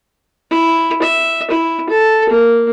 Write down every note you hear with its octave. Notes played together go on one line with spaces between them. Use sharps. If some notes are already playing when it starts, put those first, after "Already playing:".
E4
E5
E4
A4
A#3